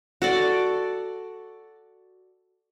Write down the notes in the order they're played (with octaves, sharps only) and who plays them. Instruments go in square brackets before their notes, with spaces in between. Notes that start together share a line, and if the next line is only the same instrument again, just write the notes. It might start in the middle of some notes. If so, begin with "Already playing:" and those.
[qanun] F#4 A4 D5